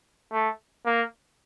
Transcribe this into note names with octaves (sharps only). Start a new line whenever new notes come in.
A3
A#3